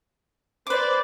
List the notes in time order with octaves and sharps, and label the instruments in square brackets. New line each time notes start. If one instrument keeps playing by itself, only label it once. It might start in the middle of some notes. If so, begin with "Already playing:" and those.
[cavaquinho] B4 D6 [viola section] C5 D5